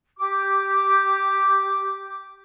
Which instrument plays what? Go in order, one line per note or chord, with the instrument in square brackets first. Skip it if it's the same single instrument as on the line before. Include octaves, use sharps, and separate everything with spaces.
[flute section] G4 D6